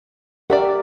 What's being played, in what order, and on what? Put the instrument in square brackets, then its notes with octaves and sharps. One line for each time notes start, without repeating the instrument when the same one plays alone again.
[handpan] G4 A#4 [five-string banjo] D5 E5 F#5